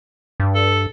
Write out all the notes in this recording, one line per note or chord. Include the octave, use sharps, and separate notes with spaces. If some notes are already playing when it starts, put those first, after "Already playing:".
G2
A4